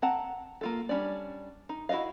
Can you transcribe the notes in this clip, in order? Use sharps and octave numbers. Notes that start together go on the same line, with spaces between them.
C4 F#5 A5 A#5
A#3 F4 A4
G3 C#4 D4 D5
D#4
E4 F#4 B4 D#5 F5